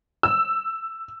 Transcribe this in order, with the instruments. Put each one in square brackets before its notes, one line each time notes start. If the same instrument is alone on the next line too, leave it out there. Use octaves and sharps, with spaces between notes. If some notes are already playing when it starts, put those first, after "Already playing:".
[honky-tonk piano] E6